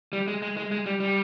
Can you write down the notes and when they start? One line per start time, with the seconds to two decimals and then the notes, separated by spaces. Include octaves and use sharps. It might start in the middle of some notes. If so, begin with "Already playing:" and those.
0.13 G3
0.28 G#3
0.42 G#3
0.57 G#3
0.71 G#3
0.86 G3
1.00 G3